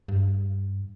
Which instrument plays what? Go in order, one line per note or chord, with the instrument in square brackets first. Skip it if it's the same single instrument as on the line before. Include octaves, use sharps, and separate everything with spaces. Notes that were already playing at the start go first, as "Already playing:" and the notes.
[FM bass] G2